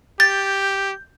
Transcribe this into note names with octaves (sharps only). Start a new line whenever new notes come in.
G4 G6 A6